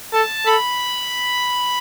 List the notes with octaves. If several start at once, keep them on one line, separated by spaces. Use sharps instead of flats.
A4 A5
A4 B5